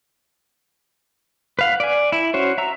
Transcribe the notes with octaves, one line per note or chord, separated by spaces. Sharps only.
B4 F5 F#5
D5 G#5
E4
C#4 F#4 C5 C#5
E5 A#5 E6